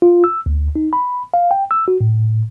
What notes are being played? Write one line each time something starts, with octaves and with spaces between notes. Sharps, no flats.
F4
E6
D2
D#4
B5
F5
G5
E6
F#4
A2